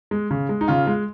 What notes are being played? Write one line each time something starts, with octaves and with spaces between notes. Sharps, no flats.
G#3
C#3
G#3
D#4
C#3 F4
G#3